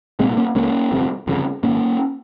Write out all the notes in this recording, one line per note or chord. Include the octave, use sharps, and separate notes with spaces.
C2 A#2 G#3 C4
A#3 C#4
C#2 C#3 A#3 C#4
G1 F2 C3
G1 F2 C#3
G#1 G#2 A#3 C#4